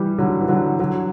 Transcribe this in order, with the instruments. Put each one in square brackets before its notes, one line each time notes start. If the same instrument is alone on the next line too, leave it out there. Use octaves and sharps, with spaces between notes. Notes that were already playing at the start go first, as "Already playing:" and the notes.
Already playing: [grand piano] E3 G3
D3 F#3
E3
D3 F#3
D3 F#3